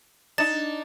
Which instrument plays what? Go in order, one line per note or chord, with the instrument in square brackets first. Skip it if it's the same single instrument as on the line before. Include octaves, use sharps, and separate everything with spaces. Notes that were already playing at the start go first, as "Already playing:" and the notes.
[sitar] D4 D#4 [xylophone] A6 E7